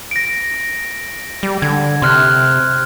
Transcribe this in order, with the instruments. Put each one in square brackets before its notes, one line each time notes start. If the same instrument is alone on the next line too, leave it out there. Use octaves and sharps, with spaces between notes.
[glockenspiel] A#6 D7
[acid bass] G3
[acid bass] D3 [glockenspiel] G#6
[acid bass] C3 [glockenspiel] C6 F6 F#6